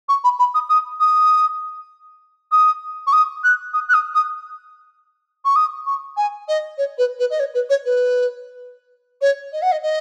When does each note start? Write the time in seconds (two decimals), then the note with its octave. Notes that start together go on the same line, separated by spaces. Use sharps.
0.08 C#6
0.24 B5
0.39 B5
0.54 D#6
0.69 D#6
1.00 D#6
2.51 D#6
3.06 C#6
3.12 D#6
3.43 F#6
3.73 D#6
3.88 F#6
3.93 D#6
4.14 D#6
5.45 C#6
5.55 D#6
5.86 C#6
6.16 G#5
6.48 D#5
6.77 C#5
6.98 B4
7.19 B4
7.30 D#5
7.39 C#5
7.54 B4
7.69 C#5
7.85 B4
9.21 C#5
9.52 D#5
9.62 F#5
9.71 D#5
9.82 D#5